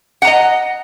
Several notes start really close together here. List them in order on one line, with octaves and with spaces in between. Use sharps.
F#5 A#5 D#5